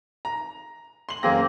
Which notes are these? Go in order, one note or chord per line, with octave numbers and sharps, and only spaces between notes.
A#5
C6 F#7
F#2 A#3 C4 G#4 A#6